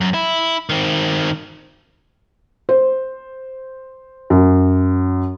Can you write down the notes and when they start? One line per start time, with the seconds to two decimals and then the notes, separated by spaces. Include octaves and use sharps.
0.01 F#2
0.14 E4
0.69 D#3 C4
2.69 C5
4.30 F#2